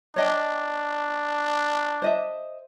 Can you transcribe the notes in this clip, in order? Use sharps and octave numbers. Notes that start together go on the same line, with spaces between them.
D4 C#5 D#5 G5
C5 D#5 E5